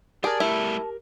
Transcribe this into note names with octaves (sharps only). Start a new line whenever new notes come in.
G4 G#4 A#4 D5 A5
G3 A3 E4